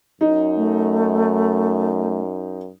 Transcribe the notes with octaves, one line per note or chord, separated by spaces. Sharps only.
F#2 D#4
A3